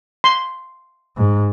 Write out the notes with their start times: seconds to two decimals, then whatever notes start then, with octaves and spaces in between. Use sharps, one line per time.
0.24 C6
1.17 G#2